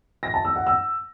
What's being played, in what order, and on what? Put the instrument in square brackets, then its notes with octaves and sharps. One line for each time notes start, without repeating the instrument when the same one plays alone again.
[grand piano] A#6
A5
E6
F#5
E6